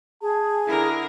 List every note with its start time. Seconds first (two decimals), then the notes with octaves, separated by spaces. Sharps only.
0.22 G#4 A5
0.66 D3 E4 A#4